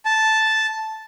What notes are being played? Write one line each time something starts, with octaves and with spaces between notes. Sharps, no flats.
A5